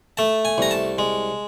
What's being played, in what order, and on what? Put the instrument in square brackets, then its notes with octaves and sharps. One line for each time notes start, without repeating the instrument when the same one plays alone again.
[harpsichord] A3 A5
G#5
C2 A#5
A5
G#3